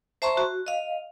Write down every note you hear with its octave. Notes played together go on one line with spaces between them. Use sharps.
C5 E5 A5 A#5 C6 C#6
F#4
D#5 F5